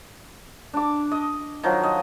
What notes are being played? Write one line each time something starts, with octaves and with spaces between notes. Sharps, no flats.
D4 D6
D#5
D#3 F3 F#3
D#5